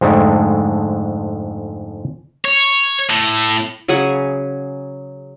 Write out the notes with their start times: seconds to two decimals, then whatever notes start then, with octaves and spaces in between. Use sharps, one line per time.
0.01 F2 G#2 D3 G#3 A3
2.45 C#5
3.10 A2
3.88 C#3 F#3 G#4 F#5